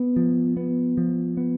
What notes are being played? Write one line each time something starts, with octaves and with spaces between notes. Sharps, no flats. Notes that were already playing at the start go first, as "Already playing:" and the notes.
Already playing: B3
F3
B3
F3
B3